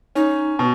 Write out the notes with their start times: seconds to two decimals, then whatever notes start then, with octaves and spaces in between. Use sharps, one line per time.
0.15 C#4 D#4
0.59 B2